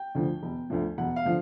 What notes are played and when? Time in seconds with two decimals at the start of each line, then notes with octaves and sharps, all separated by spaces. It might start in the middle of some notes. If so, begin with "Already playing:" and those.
Already playing: G5
0.15 D2 D3 F3
0.43 E1
0.70 D2 D3 F3
0.98 E1 F#5
1.16 F5
1.25 D3 F3